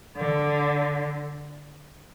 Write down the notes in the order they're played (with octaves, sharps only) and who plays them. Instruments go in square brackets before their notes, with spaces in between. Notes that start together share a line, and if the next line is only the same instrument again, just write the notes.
[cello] D3